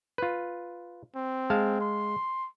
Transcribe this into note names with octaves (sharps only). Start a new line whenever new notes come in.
F4 B4
C4
G#3 F5 A5
C6